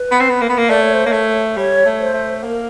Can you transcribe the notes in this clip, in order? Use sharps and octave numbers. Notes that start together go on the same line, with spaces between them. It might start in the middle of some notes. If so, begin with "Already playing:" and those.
Already playing: B4
B3
C4
B3
A#3
B3
A#3
A3 D5
C#5
C5
A#3 C#5
A3
G3 C#5
A3
C5
A3
A#3 A#4